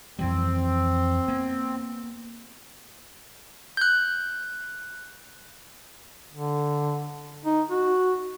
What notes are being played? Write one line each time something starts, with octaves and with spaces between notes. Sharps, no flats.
F2 E3 G3 C4
A#3 B3
F#6 G6
D3
D#4
F#4